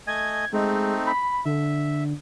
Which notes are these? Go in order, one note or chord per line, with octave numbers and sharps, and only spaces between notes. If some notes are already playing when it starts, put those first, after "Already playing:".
A3 D#5 G#5 G#6
G#3 A3 C4 D#4
B5
D3 E5